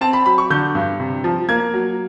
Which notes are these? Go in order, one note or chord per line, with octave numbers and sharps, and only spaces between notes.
C4 A5
B5
F#3 B5
C#6
D3 G6
G2
C3
F3
A#3 G#6
F#3